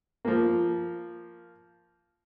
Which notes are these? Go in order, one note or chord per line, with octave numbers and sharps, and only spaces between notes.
F3 A#3